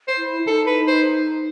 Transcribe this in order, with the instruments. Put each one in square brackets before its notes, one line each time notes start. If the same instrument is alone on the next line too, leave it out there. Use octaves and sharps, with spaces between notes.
[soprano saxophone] C5
[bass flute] E4
[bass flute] D#4 [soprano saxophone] A4
[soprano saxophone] B4
C5